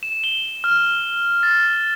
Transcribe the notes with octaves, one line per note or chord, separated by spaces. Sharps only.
E7
G7
F6
A6